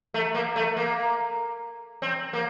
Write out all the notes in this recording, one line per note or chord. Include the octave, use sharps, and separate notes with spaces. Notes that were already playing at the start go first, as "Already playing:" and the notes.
A3
A#3
A3
A#3
C4
A#3